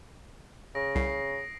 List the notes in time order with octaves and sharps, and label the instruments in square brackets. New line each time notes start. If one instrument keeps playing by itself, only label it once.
[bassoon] C#3 [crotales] D#6 A#6 D7
[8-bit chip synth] C2 [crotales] C7